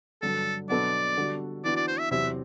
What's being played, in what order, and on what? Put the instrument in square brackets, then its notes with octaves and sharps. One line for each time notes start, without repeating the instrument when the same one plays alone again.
[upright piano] G2 D3 F#3 [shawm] A4
[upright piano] B2 F#3 B3 D4 A4 [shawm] D5
[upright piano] D3 G3 D4 F#4 A4
[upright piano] E3 B3 D4 F#4 [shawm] D5
[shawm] D5
C5
E5
[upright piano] E2 C3 F#3 C4 G4 [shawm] E5